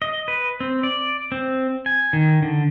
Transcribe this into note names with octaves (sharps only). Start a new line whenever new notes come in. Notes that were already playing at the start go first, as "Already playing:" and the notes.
D#5
B4
C4
D5
C4
G#5
D#3
D3